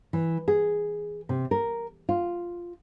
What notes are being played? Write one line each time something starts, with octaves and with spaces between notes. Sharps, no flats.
E3
G#4
C3
A#4
F4